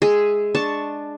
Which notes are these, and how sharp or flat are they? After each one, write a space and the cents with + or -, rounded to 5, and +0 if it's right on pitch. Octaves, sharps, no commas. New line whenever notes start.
G#3 +0 G#4 +0 E5 +0
D4 +10 A5 +0 C#6 +0